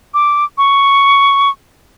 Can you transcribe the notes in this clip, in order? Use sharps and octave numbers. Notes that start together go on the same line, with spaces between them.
D6
C#6